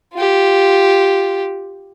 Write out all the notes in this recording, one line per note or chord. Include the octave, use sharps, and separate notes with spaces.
F4 G4